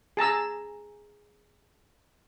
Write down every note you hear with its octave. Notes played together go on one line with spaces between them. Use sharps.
G#4 A5 A#5 E6